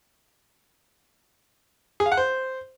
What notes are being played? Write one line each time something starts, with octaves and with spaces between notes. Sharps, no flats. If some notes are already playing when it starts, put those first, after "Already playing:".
G#4
F5
F#5
C5